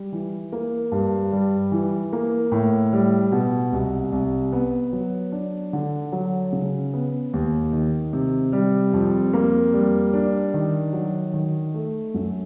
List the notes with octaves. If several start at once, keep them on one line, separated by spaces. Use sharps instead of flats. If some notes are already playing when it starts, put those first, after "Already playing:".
Already playing: G3
E3
A#3
G2
G3
E3
A#3
A2
G3
B2
C2
C2
B3
F#3
D4
D3
F#3
C#3
B3
D#2
D#3
C3
G3
F2
A#3
G3
D4
D#3
F#3
D#3
A3
F#2